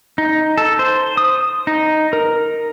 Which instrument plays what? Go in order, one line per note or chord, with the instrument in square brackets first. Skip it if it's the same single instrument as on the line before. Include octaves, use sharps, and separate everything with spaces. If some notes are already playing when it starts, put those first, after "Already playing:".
[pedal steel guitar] D#4
A4
C5
D#6
D#4
A#4